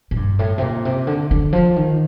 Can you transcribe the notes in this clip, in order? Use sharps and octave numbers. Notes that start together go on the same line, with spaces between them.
A2
G2
A2
C3
A#2
C3
D3
D3
F3
D#3